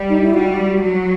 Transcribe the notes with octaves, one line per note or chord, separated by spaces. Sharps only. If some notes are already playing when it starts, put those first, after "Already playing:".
Already playing: G3
D#4
E4
G3 F#4
F#3 F#4